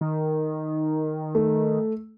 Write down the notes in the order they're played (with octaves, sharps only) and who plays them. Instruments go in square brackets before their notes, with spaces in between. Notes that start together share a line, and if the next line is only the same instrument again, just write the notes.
[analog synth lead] D#3
[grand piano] A3